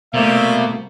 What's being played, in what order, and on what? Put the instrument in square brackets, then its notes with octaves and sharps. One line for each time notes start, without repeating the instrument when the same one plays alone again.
[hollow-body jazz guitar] C2 A3 [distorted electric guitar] B2 [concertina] A#3 [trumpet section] C5 D5 E5